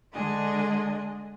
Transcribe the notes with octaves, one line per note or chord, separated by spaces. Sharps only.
D3 G#3 D4 G#4 D#5